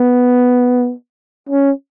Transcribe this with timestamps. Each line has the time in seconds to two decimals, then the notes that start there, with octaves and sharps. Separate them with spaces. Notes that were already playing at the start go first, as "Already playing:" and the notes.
Already playing: B3
1.49 C#4